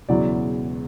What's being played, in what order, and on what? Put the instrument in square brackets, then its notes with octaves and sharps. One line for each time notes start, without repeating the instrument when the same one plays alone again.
[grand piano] E1 E2 C#3 F#3 D5